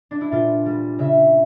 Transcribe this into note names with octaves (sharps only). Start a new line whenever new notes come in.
D4
E4
A#2 F4
G3
C#3 E5